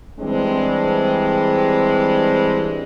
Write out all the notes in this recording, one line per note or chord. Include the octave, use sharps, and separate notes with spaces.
E3 G3 G#3 C4 D4